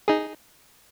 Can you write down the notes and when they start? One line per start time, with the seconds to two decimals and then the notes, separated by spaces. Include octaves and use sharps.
0.08 D#4 G#4